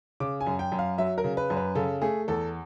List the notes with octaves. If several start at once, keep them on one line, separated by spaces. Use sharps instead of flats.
C#3 D6
G#5
F#2
G5
F#2
F5
F#3 E5
A#4
C#3
B4
F#2
B4
C#3 A4
A3 G#4
E2 A4